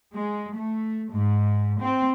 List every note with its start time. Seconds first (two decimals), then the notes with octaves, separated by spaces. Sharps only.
0.14 G#3
0.58 A3
1.10 G#2
1.81 C4